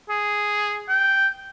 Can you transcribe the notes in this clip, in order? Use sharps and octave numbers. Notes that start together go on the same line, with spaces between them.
G#4
G5